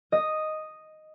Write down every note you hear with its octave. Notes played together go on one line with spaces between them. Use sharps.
D#5